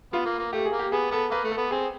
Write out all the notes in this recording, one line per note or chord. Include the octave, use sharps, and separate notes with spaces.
B3 F4
A#3
A#3
A3 G4
G#4
A#3
G4
B3 G#4
B3 A4
A#3 B4
A3
A4
B3
C4 G#4